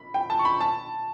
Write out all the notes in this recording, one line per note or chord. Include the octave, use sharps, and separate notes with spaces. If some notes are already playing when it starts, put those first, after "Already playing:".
Already playing: B5
G5
A5
C#6
B5
A5